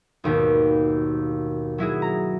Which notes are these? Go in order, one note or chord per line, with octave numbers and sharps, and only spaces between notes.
G#1 D#2 B2
F#3 E4 F#4 G#4
A#5